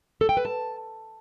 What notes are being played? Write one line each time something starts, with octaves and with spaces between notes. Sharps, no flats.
A4
G5
B4
A5